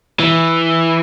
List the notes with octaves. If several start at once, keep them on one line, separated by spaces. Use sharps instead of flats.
E3